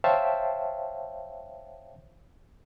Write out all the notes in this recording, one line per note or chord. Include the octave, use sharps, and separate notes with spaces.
C5 C#5 E5 F5 G5 A5